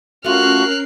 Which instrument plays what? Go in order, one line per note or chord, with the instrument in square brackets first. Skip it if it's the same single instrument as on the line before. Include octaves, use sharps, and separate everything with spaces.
[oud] A3 F4 [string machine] C#4 A#4 C7 [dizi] F#4 [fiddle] F6 F#6